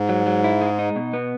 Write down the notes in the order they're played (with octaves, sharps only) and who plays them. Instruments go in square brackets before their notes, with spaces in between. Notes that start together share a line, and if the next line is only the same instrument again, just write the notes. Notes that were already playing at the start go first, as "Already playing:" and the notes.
Already playing: [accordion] G#2
[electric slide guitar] F#3
F#3
E4
G#3
D#4
B2
B3